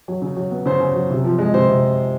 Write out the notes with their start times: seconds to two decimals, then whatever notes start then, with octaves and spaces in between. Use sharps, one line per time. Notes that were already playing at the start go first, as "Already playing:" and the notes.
0.08 F#3
0.22 C#3
0.37 F#3
0.51 B3
0.66 C#3 C5
0.80 C#3
0.95 F#3
1.10 C3
1.24 F3
1.38 G#3
1.54 C3 C5
1.69 C3